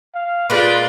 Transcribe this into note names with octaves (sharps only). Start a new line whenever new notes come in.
F5
A#2 G#3 F4 B4 D5